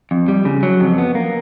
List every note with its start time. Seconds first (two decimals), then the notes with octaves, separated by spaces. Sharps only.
0.11 F2
0.28 G3
0.45 C#3
0.63 F#3
0.80 F2
0.98 B3
1.15 A#3